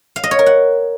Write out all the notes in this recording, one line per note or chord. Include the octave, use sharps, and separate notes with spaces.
F5
D#5
C#5
A#4
F#5